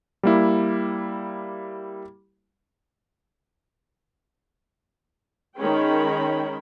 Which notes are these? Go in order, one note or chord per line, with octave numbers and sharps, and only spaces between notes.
G3 A#3 E4
D#3 G#3 C#4 C#5 G5 B5